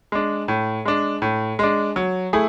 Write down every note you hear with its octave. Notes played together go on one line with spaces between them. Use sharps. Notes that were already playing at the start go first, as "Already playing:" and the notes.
G#3 D4
A2
G#3 D4
A2
G#3 D4
F#3
A3 E4 G#4